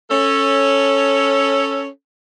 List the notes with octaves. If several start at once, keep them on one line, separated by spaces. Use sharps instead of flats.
C#4 A4